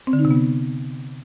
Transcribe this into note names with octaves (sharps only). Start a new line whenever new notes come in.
C4
D3
D#4
C3
B3